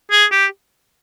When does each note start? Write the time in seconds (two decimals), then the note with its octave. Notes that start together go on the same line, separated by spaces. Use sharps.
0.11 G#4
0.32 G4